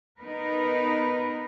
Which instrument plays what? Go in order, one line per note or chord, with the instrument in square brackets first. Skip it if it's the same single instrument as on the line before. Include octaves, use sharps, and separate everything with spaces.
[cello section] B3 D#4 A#4 B4